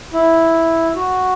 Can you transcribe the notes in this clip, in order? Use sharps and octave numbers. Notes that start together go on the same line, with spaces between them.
E4
F#4